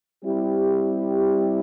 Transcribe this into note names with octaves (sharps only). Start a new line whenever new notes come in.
G3 C4 E4 G4